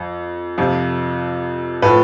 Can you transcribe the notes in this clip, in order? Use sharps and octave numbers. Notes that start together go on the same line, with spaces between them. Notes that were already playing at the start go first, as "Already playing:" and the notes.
Already playing: F2
F2 C3 F3
A2 F3 B4